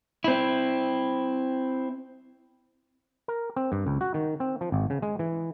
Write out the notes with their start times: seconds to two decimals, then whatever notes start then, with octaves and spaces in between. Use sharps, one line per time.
0.24 C4 E4
3.28 A#4
3.56 C4
3.72 G2
3.87 C#2
4.01 F#4
4.14 D#3
4.40 C4
4.61 F3
4.72 G#1
4.90 C#3
5.02 G#3
5.19 E3